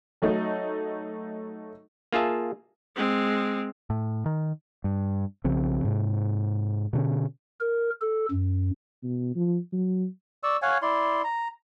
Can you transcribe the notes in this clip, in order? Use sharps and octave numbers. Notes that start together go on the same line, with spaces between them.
F#3 A3 D#4
A#3 F4 G#4 E5 A5
G#3 C4
A2
D#3
G2
B1 C#3 F3 C4
G#2 C3
B2 D3 C4 C#4
A#4
A4
F#2
B2
F3
F#3
D5 C#6 E6
C#5 F5 F#5 G#5
E4 D5 C6
A#5